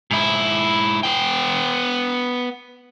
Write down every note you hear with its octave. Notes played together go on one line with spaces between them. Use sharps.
G#2 E4
B3 G5